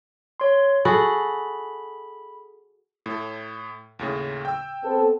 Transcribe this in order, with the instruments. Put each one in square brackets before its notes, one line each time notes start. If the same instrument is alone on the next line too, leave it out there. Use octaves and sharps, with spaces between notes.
[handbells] C#5 C6
[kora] F#4 G#4 A4 [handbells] B5
[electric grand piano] A2 A4
D#2 A2 C#3
G5 E6
[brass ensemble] B3 C4 A4